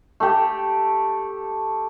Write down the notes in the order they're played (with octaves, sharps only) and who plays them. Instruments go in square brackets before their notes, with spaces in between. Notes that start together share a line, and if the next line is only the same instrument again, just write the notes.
[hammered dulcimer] A3 G4